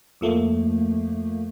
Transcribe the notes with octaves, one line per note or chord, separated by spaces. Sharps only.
F2 F3 A3 A#3